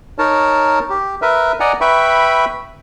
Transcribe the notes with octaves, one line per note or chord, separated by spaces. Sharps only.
D#4 A#4 C#5 A5
G4
A#4 B4 E5
D5 D#5 F#5 G#5 A#5
B4 E5 G5 B5 C#6